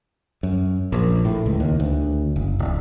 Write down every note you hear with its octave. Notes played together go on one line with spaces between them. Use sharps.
F#2
A#1
A2
C#2
D#2
D2
F#1
D1